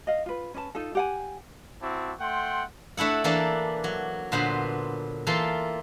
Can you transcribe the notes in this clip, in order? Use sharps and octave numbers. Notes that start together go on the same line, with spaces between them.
D#5 F5
F4 B4
C#4 B4 D5 A5
D#4 F4 A4
G4 F#5 G#5
C4 E4 F#4 A5 D6
A3 F#5 G5 C6
A3 D4 E4 F#5
E3 A#3 D4 A4 D5
F#3
A#2 D3 B3 C5 B5
E3 A#3 F4 A4 C6